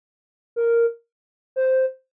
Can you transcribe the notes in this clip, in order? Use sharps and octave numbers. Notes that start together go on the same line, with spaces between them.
A#4
C5